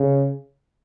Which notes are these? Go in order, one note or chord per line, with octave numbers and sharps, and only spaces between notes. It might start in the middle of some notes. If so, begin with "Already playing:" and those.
Already playing: C#3